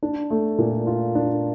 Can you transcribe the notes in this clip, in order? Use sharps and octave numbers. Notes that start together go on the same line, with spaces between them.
D4
A3
A#2
F4
D4